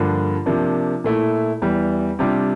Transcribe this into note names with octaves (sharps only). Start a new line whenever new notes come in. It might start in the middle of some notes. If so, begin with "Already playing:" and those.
Already playing: G2 D3 F3 A#3
C3 F3 A#3 D4
A#2 A3 E4
E2 E3 G3
C3 G3 D4 F4